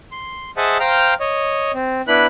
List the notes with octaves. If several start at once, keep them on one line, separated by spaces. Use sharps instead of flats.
C6
G#4 C5 D#5 E5 F#5 A5
C5 F5 G5 A#5 F6
C#5 D#5
C4
B3 D4 E4 B4 B5 F#6